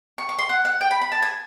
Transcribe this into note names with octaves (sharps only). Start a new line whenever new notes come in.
C#6
C#6
C6
F#5
F#5
G5
B5
B5
A5
G#5